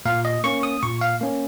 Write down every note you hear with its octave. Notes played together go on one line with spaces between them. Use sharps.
A#2 F5
D#5
A#3 C#4 C#6
D#6
A#2 C#6
F5
A#3 C#4